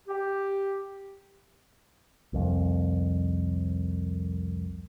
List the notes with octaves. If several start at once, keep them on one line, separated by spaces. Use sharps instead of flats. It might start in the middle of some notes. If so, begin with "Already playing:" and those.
G4
C2 F2